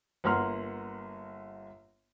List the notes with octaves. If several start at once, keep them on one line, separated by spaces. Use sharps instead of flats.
G1 A#3 F#5 A#5 C6 F6